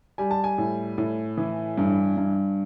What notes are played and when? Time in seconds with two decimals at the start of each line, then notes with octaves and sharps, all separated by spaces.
0.18 G3 G#5
0.31 A5
0.44 G#5
0.58 A2
0.98 A2
1.37 E3
1.78 G2
2.17 G2